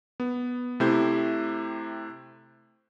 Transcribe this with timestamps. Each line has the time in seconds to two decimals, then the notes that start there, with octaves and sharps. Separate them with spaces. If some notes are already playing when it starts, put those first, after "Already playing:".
0.20 B3
0.80 C3 A3 E4 G4 C5 G6